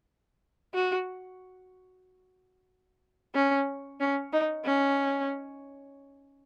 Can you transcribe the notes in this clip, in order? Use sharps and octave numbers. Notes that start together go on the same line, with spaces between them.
F#4
C#4
C#4
D#4
C#4